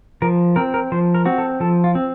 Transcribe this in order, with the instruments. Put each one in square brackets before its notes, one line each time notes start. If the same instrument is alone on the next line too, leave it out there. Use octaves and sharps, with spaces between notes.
[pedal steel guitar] F3 A#4
C4 A#4
A#4
F3 C5
A#4
C4 F#4
A4
F3 A4
F4
C4